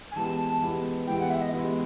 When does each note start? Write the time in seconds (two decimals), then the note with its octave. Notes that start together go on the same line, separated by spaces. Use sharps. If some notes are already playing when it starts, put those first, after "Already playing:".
0.11 G#5
0.16 E3 G#3 B3 E4 G4 A5
0.61 E3 G#3 B3 E4 G4
1.07 E3 G#3 B3 E4 G4 G5
1.19 F#5
1.30 E5
1.41 D#5
1.52 E3 G#3 B3 E4 G4